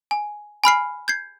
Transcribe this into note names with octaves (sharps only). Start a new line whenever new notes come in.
G#5
G#5 B5 F6 C7
G6 G#6 C7